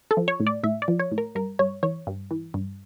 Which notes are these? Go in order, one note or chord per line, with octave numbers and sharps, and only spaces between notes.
A4
F3
C#5
A2
D5
A2 E5
D5
F3
C#5
A2
A#4
G2 A#4
G2 C#5
E3 C#5
G2
E3
G2